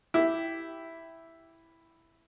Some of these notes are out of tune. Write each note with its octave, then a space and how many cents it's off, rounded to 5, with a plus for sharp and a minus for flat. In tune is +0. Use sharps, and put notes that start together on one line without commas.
E4 +0 G4 -5